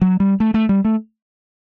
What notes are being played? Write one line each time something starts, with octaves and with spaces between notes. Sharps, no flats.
F#3
G3
A3
A3
G3
A3